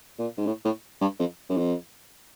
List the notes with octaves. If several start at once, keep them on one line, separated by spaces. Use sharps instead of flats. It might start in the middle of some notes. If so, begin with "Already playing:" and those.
A#2
G#2
A2
A2
G2
F2
F#2
F2